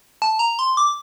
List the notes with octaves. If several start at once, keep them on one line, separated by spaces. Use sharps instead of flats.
A5
A#5
C6
D6